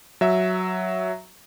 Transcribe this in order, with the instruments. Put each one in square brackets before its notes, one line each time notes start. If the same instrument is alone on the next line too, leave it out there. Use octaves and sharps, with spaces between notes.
[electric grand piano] F#3 E5